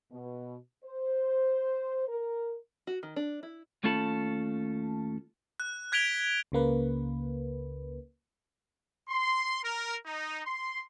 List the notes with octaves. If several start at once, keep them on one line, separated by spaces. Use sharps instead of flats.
B2
C5
A#4
F#4
D#3
D4
E4
D#2 A3 C#4 F4 A4 B5
F#6
F#6 G#6 B6 D7 F7 G7
C#2 C#3 A#3 B4
C6
A#4
D#4
C6